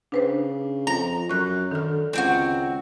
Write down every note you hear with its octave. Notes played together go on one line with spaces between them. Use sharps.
C#3 D4 B4 C5
F2 A#5
F#2 C#6 F#6
D3 D#3 F6
C#2 C4 D4 F#4